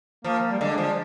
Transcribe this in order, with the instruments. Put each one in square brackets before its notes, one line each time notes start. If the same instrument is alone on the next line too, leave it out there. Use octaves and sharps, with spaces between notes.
[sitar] F3 [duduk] A#3
[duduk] G3
[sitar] D3 [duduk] G#3
[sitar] F3